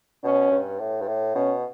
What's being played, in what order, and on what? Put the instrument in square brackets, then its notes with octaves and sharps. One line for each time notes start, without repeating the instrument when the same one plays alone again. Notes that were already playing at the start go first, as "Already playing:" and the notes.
[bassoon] B2 [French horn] C#4
[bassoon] G2
A2
G2
A2
[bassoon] B2 [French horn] C#4